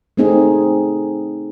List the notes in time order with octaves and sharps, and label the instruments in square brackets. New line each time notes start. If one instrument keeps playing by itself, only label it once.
[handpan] A3 C4 D#4 G#4